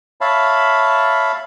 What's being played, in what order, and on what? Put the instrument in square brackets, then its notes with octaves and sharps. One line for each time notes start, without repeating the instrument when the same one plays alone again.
[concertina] C#5 E5 F5 A5 B5